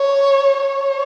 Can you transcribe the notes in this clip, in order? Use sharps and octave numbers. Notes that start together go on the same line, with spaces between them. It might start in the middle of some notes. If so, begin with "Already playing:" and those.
Already playing: C#5
C#5